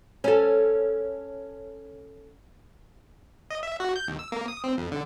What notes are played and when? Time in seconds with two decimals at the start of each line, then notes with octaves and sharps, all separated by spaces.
0.24 C#4 A4
3.51 D#5
3.63 E5
3.80 F#4
3.96 G6
4.07 D#2
4.19 E6
4.32 A#3
4.48 D#6
4.64 C4
4.78 F2
4.92 D3